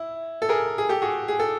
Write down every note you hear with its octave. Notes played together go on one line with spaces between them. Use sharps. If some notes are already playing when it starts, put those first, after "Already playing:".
Already playing: E4
A4
G#4 A#4
G#4
G4 A4
F#4 G#4
G#4
A4